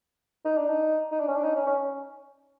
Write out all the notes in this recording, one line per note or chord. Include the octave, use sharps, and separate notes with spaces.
D#4
D4
D#4
D#4
D4
C#4
D4
D#4
C#4
C#4